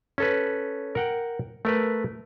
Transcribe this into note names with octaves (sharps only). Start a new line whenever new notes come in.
C#4 A4 B4
A#4 F#5 G5
A3 A#4 B4